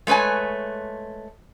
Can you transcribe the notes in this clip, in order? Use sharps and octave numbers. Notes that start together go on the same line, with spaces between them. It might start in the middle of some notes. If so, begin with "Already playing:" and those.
G#3 A3 B4 C#5 G#5